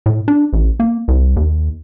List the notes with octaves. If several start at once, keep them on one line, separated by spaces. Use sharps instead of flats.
A2
D4
A1
A#3
C2
D#2